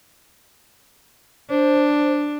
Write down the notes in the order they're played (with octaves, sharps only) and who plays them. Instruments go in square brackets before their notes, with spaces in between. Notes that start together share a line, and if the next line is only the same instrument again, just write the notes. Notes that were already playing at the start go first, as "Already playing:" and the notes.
[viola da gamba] D4 [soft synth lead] C5